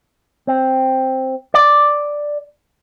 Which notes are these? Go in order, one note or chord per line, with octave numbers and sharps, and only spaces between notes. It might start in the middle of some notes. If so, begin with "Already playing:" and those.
C4
D5